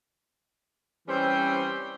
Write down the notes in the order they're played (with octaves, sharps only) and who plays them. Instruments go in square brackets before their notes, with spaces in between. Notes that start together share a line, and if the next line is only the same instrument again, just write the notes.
[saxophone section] E3 G3 C4 C#4 C5